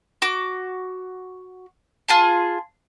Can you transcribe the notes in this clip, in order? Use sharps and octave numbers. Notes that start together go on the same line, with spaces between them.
F#4 D6
F4 G#4 A5